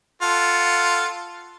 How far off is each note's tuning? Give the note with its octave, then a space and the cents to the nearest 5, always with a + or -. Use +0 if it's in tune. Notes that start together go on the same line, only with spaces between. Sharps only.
F4 +0 A4 +0 F#5 +0